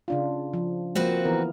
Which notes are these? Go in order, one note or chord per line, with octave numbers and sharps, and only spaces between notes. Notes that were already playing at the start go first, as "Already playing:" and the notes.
C#3 D4 F4
F3
F3 A#3 C4 F#4 B4
E3 B3 A#4